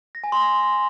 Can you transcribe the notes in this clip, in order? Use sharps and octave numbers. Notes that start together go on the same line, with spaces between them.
A#6
G#5
C6
A#6